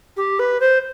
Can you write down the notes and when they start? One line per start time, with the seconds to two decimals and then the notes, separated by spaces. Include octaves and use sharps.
0.17 G4
0.39 B4
0.60 C5